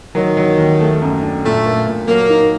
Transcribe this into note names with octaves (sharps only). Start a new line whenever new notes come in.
D#3 F#3
F#3
D#2
A3
F#2
D4
A#2 A3
A#3
A#2
F#3 A#3
D#4